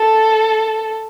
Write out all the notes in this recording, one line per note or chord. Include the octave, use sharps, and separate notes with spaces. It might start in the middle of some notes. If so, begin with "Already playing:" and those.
Already playing: A4